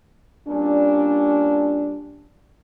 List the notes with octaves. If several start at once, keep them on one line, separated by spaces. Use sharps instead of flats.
A#2 G3 C#4 D4